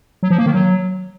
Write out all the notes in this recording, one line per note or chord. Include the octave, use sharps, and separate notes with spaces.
F#3
F3
A#3
D#3
F#3